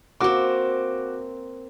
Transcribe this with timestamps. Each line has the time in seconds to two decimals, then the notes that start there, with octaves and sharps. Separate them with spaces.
0.20 A#3 C4 F#4 D6